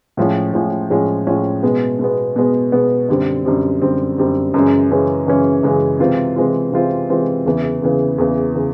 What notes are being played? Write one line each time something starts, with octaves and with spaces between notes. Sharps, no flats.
A2 F3 G#3 C#4
A2 F3 G#3 C#4
A2 F3 G#3 C#4
A2 F3 G#3 C#4
B2 G#3 B3
B2 G#3 B3
B2 G#3 B3
B2 G#3 B3
F#2 D3 G3 C4
F#2 D3 G3 C4
F#2 D3 G3 C4
F#2 D3 G3 C4
F#2 C#3 E3 G#3 C#4
F#2 C#3 E3 G#3 C#4
F#2 C#3 E3 G#3 C#4
F#2 C#3 E3 G#3 C#4
C3 E3 G#3 C4 F4
C3 E3 G#3 C4 F4
C3 E3 G#3 C4 F4
C3 E3 G#3 C4 F4
E2 C#3 E3
E2 C#3 E3
E2 C#3 E3
C#3 E3